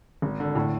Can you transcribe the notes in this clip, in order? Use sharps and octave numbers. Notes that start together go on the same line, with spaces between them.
G#1
D3
A2